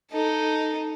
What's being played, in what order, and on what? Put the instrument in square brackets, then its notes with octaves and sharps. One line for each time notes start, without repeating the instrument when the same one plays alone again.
[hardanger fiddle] D#4 A4